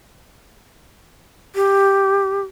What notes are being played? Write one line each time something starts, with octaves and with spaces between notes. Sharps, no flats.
G4